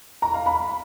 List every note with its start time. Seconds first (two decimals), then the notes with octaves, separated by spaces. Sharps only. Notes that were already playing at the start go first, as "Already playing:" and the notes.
0.22 A#5
0.34 F5
0.46 B5